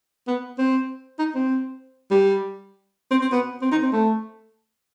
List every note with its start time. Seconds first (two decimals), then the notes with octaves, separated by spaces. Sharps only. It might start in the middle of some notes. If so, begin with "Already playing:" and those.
0.28 B3
0.58 C4
1.19 D#4
1.35 C4
2.11 G3
3.11 C4
3.22 C4
3.32 B3
3.62 C4
3.72 D#4
3.83 C4
3.92 A3